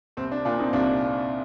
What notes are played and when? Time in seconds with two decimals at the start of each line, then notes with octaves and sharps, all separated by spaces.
0.17 C2 C4
0.31 D4
0.45 A#2 D4 F4
0.59 C4 D#4
0.73 C2 D4 F4